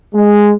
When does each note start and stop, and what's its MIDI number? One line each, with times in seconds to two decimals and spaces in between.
0.14 0.53 56